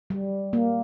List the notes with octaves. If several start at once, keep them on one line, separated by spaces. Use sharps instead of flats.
G3
A#3